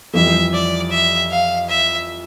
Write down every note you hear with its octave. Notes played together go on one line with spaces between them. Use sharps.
F2 E3 G3 E5
D5
E5
F5
E5